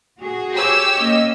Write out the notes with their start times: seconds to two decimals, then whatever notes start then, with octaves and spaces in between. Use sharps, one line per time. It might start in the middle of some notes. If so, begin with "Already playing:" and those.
0.20 F#4 G#4
0.53 G4 C#5 E6
0.96 A#3 C#4 D#5